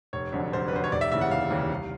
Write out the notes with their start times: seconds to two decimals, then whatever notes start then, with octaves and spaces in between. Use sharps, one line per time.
0.13 F1 C#5
0.33 F2 D3 F#3
0.53 F1 C5
0.68 B4
0.73 F2 D3 F#3 C5
0.84 C#5
0.92 F1 D5
1.01 E5
1.12 D#2 C#3 E3 E5
1.21 F#5
1.31 F1 F5
1.50 D#2 C#3 E3
1.71 C2